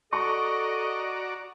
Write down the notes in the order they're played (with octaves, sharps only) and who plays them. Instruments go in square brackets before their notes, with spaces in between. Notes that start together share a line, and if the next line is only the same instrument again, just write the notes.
[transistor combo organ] F#4 D5 A#5 [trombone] A4 [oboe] D#5 [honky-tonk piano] C#6